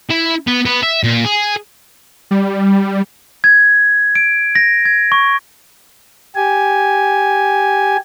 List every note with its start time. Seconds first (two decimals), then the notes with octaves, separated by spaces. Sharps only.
0.10 E4
0.47 B3
0.65 B3
0.83 E5
1.04 A#2
1.24 G#4
2.31 G3
3.44 G#6
4.15 D7
4.55 A#6
4.85 G#6
5.12 C#6
6.35 G4 G#5